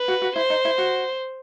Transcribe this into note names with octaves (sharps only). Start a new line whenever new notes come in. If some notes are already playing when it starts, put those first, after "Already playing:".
Already playing: B4
F#4
F#4
E4 C5
D#4
E4
F#4